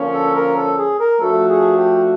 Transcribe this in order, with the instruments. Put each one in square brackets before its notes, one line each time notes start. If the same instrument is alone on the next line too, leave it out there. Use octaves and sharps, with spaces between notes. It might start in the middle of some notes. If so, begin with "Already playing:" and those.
Already playing: [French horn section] D3 F3 A#3 C#4
[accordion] A4
A#4
A4
G#4
A#4
[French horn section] F3 A3 D4 F#4 [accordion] A4
[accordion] G#4
G4